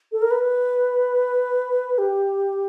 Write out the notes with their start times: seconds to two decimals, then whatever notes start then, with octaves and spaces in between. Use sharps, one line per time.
0.12 A4
0.22 A#4
0.31 B4
1.98 G4